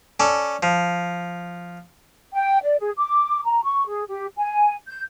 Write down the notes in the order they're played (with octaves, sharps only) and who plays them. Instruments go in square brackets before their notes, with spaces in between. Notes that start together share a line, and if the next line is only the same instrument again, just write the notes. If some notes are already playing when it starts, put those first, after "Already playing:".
[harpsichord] C#4 A4 D5
F3
[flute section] G5
D5
G#4
D6
A#5
C#6
G#4
G4
G#5
G6